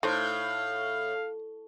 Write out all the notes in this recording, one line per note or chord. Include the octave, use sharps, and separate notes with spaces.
A2 A3 D#4 C5 F5